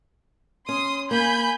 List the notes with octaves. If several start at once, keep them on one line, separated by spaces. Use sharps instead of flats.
C#4 C6 D#6
A#3 G#5 B5 G6